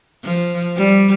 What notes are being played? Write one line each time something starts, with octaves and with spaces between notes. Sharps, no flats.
F3
G3